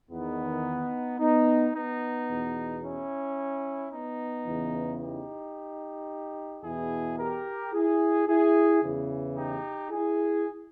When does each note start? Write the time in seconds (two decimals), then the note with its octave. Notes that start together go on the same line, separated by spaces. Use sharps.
0.11 E2 D#3 B3 D#4
1.19 B3 D#4
1.74 B3 D#4
2.29 E2 B2
2.83 C#4 E4
3.92 B3 D#4
4.46 E2 C#3 E3
5.01 D#4 G4
6.64 E2 B2 E4 G#4
7.19 G4 A#4
7.73 E4 G#4
8.28 E4 G#4
8.82 E2 C#3 E3
9.37 D#4 G4
9.91 E4 G#4